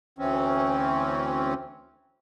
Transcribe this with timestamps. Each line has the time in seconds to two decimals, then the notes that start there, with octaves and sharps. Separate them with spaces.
0.19 D2 E3 C4 C#4